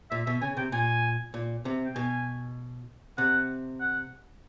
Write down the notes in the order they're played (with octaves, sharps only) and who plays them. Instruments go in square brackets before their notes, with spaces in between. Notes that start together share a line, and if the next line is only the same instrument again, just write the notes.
[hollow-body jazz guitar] A#2 [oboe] E5
[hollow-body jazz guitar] B2 [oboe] E5
[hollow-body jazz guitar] C#3 [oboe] G#5
[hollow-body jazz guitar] C3 [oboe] G5
[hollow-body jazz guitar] A#2 [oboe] G#5
[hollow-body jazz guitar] A#2
C3
[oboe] G5
[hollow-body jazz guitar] B2 [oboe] G#5
[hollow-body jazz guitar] C3 [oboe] F#5
[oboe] F#5